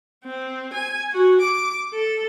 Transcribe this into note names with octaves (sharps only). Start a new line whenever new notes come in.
C4
G#5
F#4
D6
A4